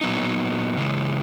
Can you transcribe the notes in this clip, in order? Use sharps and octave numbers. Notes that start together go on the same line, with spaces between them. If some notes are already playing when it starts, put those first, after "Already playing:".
A#2 F#3 B3 D#4
C#3 E3 G#3